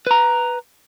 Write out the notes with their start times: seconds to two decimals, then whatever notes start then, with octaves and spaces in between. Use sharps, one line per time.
0.07 B4 A#5